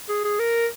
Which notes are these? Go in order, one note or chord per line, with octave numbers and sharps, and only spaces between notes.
G#4
G#4
A#4